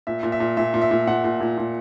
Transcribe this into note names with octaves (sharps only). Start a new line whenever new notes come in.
A#2 E5
A#2
E5
A#2
A#2 E5
A#2
E5
A#2
A#2 F#5
A#2
A#2
A#2